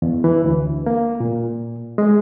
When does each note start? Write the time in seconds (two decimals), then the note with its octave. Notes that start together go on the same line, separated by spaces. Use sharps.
0.02 E2
0.24 E3
0.44 D2
0.86 A#3
1.20 A#2
1.98 G#3